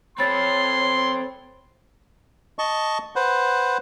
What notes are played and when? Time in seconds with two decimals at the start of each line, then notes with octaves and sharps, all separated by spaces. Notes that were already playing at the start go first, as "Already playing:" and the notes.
0.18 C4 A4 C#5 B5 C6 A6
2.59 D#5 A5 C#6
3.16 B4 C5 F#5